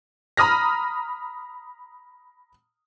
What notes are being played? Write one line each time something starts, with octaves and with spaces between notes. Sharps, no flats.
A#5 B5 D#6 F6 A#6